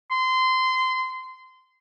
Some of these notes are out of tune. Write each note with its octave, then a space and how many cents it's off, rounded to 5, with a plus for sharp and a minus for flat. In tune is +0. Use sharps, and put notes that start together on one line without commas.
C6 -20